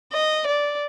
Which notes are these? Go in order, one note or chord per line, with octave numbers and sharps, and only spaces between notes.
D#5
D5